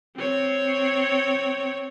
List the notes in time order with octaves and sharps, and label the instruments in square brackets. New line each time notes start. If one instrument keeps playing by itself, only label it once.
[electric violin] C4 C#5